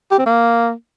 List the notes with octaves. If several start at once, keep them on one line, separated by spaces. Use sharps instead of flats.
G4
C4
A#3